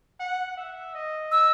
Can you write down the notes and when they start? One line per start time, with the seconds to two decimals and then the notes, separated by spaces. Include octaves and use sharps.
0.20 F#5
0.57 E5
0.95 D#5
1.31 E6